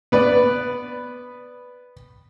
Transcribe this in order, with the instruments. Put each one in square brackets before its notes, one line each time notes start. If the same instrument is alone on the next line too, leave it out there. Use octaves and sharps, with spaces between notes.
[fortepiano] B3 B4 D5